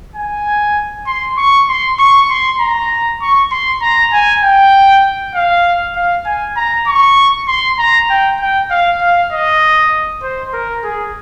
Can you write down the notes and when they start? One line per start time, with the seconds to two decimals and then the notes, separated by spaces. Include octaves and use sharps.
0.16 G#5
1.07 C6
1.38 C#6
1.68 C6
1.99 C#6
2.30 C6
2.60 A#5
3.21 C#6
3.51 C6
3.81 A#5
4.13 G#5
4.43 G5
5.35 F5
5.95 F5
6.26 G#5
6.56 A#5
6.87 C#6
7.48 C6
7.79 A#5
8.10 G5
8.40 G5
8.70 F5
9.01 F5
9.32 D#5
10.23 C5
10.53 A#4
10.84 G#4